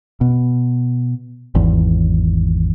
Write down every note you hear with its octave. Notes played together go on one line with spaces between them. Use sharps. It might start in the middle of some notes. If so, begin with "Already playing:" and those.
B2
G#1 E2